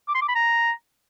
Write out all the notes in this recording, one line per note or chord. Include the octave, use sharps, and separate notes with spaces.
D6
C6
D6
B5
A#5